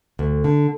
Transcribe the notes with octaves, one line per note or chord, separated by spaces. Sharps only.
D2
D3